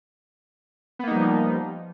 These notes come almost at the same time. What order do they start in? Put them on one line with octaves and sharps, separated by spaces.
B3 A#3 D#4 G3 F3